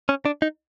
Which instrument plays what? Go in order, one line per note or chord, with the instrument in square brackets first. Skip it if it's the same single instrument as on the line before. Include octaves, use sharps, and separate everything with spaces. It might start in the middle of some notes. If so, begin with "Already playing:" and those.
[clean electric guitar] C#4
D4
D#4